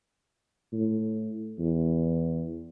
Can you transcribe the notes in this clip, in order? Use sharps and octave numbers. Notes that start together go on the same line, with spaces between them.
A2
E2